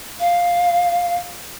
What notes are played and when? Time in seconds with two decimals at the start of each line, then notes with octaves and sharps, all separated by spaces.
0.20 F5